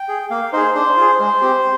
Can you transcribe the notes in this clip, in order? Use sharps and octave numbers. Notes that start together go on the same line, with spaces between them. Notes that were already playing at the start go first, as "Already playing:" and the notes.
Already playing: G5
G#4
A#3 F5
D#4 G#4 C5
D4 C5
F4 G#4
G#3 C5
C4 G4